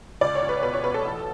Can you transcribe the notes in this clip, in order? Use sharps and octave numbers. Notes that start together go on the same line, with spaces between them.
C#2 D5
C#5
C#2
B4
B2 B4
C#5
B2 B4
A4
A1